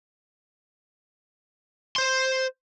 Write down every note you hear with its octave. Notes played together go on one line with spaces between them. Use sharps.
C5 C6